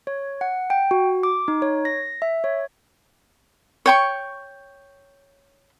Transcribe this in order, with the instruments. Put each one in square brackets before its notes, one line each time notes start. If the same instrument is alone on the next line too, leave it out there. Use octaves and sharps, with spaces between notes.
[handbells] C#5
F#5
G5
F#4
D6
D#4
C#5
A#6
E5
C#5
[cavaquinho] C#5 G5 C#6